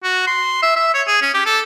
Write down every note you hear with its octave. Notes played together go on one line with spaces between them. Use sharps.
F#4
C6
E5
E5
C#5
G#4
C#4
G4
A4